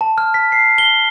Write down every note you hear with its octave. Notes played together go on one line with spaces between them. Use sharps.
A5
F6
B6
C7
G7